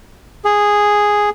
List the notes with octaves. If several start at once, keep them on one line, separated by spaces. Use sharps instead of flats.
G#4